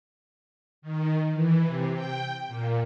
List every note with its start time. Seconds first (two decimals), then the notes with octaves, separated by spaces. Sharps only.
0.82 D#3
1.33 E3
1.65 C3
1.94 G5
2.47 A#2